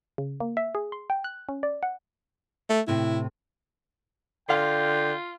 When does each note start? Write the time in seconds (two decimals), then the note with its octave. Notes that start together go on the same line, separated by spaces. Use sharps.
0.18 C#3
0.40 A#3
0.57 E5
0.75 G#4
0.92 C6
1.10 G5
1.24 F#6
1.49 C#4
1.63 D5
1.83 F#5
2.69 A3
2.88 A2 C3 E4
4.49 D3 F4 F5 G5 C6